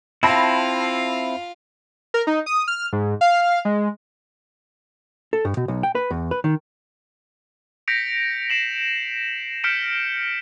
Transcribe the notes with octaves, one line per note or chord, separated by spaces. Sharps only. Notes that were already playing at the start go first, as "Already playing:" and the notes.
C4 E4 F4 F5 A5 B5 A#6
A#4
D#4
D#6
F6
G#2
F5
G#3
A4
G2
B2
B1
G5
B4
E2
B4
D#3
G6 A#6 B6 C#7 D7 F7
B6 C7 E7 F#7
F6 G6 B6 C#7 D7 E7